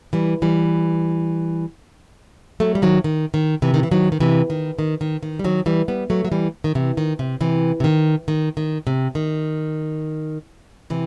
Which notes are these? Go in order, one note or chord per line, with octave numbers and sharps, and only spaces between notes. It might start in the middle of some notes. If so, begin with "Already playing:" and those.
E3 G3
E3 G3
F#3 A3
G3
D#3 F#3
D#3
D#3
C3 E3
D#3
E3
D#3 F#3
D#3
C3 E3
D#3
D#3
D#3
D#3
G3
D#3 F#3
E3 G3
G3 B3
F#3 A3
F#3
E3 G3
D#3
C3 E3
D#3
C3
C3 E3
C3
D#3
D#3
D#3
C3
D#3
C3 E3